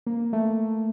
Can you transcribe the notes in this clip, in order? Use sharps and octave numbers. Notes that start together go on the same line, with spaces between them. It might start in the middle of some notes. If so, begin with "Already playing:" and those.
A#3
A3